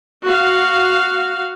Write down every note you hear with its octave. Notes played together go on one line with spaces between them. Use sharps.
F#4 F5